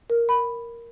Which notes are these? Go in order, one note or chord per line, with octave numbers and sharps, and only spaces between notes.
A#4
B5